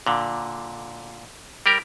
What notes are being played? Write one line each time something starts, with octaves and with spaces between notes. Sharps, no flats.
A#2 D3
G3 G4 A#4